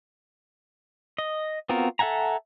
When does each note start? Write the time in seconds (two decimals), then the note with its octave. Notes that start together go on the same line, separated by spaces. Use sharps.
1.18 D#5
1.69 B3 C4 F4 F#4 A#4
1.99 A4 E5 F#5 G#5 A#5